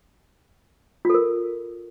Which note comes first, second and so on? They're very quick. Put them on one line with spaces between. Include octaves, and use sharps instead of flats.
F4 A4 A#4